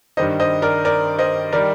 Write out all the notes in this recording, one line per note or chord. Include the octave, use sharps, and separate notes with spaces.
G2 D#3 G3 C5 D#5
C5 D#5
A#4 D5
A#4 D5
C5 D#5
D#3 G3 A#4 D5